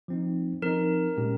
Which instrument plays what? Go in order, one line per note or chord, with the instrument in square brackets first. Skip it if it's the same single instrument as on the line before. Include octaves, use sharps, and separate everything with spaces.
[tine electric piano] F3 C4 D#4
[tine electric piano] F3 C4 D#4 [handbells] A#4
[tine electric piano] A#2 G#3 C#4 G4